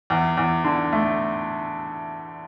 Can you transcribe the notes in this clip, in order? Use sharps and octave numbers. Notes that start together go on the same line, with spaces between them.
E2
E2
D3
A3